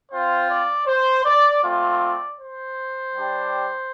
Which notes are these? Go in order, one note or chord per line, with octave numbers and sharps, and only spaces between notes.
C4 F4 C5
D5
C5
D5
A3 C4 F4 D5
C5
G3 D4 G4